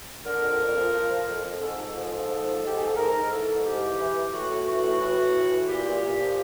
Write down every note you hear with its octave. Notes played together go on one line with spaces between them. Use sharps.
D3 A#4
F2
F2
F3
F3
F3
F2
F2
G#2 A4
G#2
F3
F3
G#2
F3
G#2 G4
G#2 G#4
A4
G#2 A#4
G#2
E3 A4
G#2
G#2 G4
E3
E3
E3
A2 F#4
A2
E3 F#4
A2
E3 F#4
A2
E3
E3
A#2 G4
A#2
A#2
F3